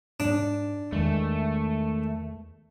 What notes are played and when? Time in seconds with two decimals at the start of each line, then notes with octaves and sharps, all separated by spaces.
0.20 G#2 D4
0.92 E2 D#3 G#3 A3